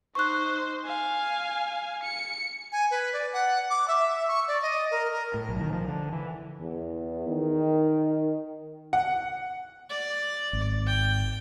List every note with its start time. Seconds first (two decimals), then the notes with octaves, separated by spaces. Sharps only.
0.15 D#4 C5 C#6 F#6
0.85 F5 G#5
2.03 C#7
2.72 G#5
2.91 B4
3.13 D5
3.33 F#5
3.70 D6
3.88 E5
4.28 C#6
4.48 D5
4.62 D#5
4.91 A#4
5.12 A#4
5.34 A2
5.49 B1
5.61 D#3
5.73 F3
5.88 D3
6.12 E3
6.61 E2
7.29 D#3
8.93 F#5
9.90 D5
10.53 G#1
10.87 G5